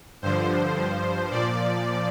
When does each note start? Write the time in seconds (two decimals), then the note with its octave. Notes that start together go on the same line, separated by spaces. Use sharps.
0.22 G2 D3 F3 C5
0.76 G2 F3
1.31 A#2 F3 D5